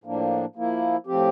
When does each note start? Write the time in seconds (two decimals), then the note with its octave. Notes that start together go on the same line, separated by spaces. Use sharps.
0.04 A2 F3 A#3 D4
0.55 F3 A#3 E4
1.07 A2 F3 C4 G4